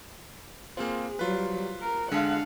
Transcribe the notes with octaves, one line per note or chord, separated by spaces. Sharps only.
A#3 C4 F4 G#4 C5
F#3 G3 F4 B4
A#4
D3 G#3 D4 F5 F#5 A5